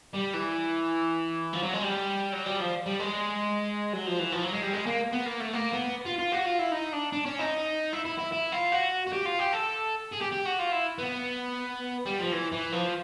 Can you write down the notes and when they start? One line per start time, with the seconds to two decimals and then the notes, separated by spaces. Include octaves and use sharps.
0.13 G3
0.34 E3
1.53 F3
1.63 F#3
1.73 G#3
1.82 G3
2.33 F#3
2.46 G3
2.60 F3
2.86 G3
3.00 G#3
3.93 F#3
4.07 F3
4.19 E3
4.32 F3
4.43 F#3
4.53 G#3
4.63 G3
4.73 G#3
4.86 A#3
5.12 B3
5.26 A#3
5.40 A3
5.53 A#3
5.73 B3
6.06 F4
6.19 F4
6.32 F#4
6.46 F4
6.59 E4
6.72 D#4
6.93 D4
7.13 D4
7.26 C#4
7.39 D#4
7.93 E4
8.05 E4
8.19 E4
8.32 E4
8.52 F4
8.72 F#4
9.07 F#4
9.13 G4
9.26 F4
9.39 G4
9.53 A4
10.13 G#4
10.22 G4
10.32 G4
10.46 F#4
10.60 F4
10.72 E4
10.98 B3
12.06 G3
12.19 F3
12.32 E3
12.52 E3
12.73 F3